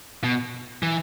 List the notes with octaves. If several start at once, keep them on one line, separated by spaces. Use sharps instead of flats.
B2
E3